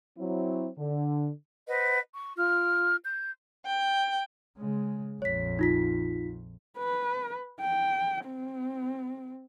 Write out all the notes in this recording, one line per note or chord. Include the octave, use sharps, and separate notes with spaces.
F#3 C4 E4
D3
B4 C5 D#5 F#5
C#6
F4 F6
G6
G5
C#3 G#3
A#1 F2 C#5 B6
D#4 F4 B6
B4
G5
C4